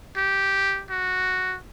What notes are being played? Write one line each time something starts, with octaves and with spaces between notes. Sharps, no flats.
G4
F#4